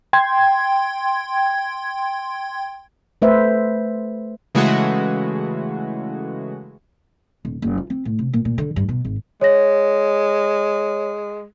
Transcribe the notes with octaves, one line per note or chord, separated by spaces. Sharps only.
G5 C6 G#6
A3 B4 C5 E5
C#3 E3 G#3 A3 F#4
D#1
F#1
F4
C4
A2
C3
A#2
A#2
D3
G2
B2
G#1
G#3 C#5 A#6